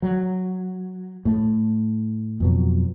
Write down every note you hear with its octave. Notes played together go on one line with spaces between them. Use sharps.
F#3
A2 A3
F2 B2 F#3